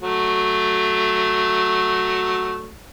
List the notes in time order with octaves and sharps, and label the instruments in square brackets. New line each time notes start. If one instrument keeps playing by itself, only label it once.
[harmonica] F#3 A3